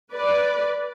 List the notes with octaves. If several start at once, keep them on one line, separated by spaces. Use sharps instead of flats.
B4 D5